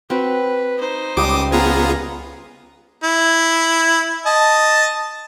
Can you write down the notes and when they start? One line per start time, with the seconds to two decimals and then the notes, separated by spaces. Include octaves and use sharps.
0.10 C4 F#4 B4
0.78 D#4 C5
1.17 C#2 G3 D6 D#6
1.52 B3 F4 G#4 A#5
3.03 E4
4.26 D#5 A5